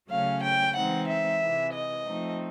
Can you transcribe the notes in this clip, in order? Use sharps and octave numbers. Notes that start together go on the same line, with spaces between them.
C#3 F#3 A3 C#4 F5
G5
E3 G#3 C4 D#4 F#5
E5
C3 E3 G#3
D#5
F3 A3 C4 D#4